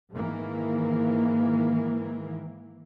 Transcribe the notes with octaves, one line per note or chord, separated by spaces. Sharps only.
G#2 D#3 E3 A#3